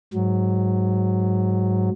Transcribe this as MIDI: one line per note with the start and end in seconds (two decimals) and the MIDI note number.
0.14 1.90 44
0.14 1.90 54